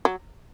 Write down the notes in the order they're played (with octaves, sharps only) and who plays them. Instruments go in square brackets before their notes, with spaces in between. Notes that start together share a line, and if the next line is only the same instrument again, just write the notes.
[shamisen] F#3